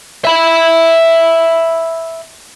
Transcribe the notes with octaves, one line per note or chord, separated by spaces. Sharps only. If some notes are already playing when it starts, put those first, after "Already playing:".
E5 B5